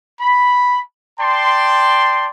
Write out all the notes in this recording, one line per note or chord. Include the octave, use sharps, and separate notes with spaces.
B5
D5 G5 A5 C6